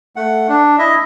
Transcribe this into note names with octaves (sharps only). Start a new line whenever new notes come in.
A3 F#5
D4
E4 D#5 E5